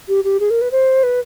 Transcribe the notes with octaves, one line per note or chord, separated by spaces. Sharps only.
G4
G4
G#4
A#4
B4
C5
B4